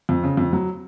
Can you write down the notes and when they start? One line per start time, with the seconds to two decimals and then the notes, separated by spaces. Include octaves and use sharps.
0.09 F2
0.23 C#3
0.37 F2
0.53 F#3